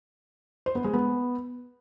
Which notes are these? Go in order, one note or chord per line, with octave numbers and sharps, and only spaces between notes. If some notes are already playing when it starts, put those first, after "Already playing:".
C5
B3
G#3
B3